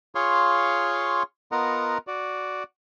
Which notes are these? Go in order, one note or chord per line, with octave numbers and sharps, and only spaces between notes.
F4 G#4 C#5 F5 C6 C#6
B3 F4 A#4 D#5 F#5 A#5
F#4 D5